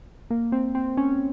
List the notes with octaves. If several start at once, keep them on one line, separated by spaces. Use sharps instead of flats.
A#3
C4
C4
C#4